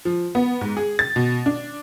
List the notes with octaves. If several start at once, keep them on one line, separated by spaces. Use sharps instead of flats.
F3
B3
G#2
G#4
A6
B2
D4